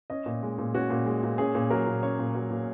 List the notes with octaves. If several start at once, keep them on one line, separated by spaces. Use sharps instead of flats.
C#4 D#5
A#2
G#3
A#2
C#4 F#4
A#2
G#3
A#2
C#4 G#4
A#2
F#3 A#4
A#2
C#4 C#5
A#2
F#3
A#2